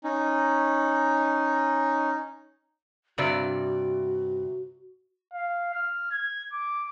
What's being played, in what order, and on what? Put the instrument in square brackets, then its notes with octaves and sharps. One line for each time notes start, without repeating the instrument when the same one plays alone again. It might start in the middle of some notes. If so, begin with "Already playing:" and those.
[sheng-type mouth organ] C#4 D#4
[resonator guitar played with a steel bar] G2 C3 D5 [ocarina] F#4
[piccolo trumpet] F5
F6
G#6
D6